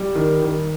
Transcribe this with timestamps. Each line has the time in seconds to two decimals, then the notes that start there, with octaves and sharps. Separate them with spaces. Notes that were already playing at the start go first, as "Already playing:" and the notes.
Already playing: G3
0.15 D#3
0.42 D#3